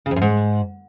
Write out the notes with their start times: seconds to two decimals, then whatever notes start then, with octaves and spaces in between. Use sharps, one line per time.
0.06 C#3
0.11 F2
0.16 F#2
0.22 G#2